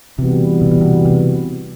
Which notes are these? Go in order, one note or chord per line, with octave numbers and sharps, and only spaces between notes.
C3 E3 G3 B3 F#4
C3
B2
C3
C3